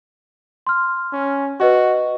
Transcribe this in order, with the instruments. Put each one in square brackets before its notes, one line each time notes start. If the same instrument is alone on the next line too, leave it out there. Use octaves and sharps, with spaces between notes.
[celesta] C6 F6
[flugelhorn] C#4
[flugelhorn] F#4 [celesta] B4 D#5 C#6